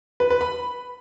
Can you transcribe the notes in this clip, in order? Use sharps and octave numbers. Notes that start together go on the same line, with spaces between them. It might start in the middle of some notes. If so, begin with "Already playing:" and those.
B4
B4
B5